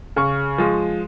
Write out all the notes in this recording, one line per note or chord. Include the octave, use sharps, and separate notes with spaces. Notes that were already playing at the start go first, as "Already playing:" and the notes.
C#3 C#6
F3 G#3